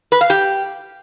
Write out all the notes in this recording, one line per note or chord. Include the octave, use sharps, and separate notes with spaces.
B4
F5
G4